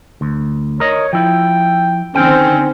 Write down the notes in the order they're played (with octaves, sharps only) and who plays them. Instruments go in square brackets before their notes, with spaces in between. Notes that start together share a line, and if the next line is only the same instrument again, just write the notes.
[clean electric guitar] D2
[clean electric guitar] A#4 D#5 [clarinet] C#5
[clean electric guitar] F3 E4 [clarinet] G5
[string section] D3 D#3 C4 [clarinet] C#4 [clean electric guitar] G5